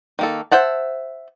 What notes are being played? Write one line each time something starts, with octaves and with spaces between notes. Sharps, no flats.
D#3 A#3 A4
C5 E5 F#5 A5